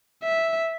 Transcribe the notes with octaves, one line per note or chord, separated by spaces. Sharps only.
E5